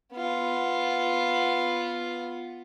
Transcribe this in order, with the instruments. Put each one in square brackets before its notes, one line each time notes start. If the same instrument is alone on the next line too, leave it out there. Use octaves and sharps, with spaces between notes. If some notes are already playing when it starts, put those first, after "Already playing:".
[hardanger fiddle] B3 F4